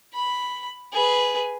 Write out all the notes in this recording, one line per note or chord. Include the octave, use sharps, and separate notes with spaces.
B5
G#4 B4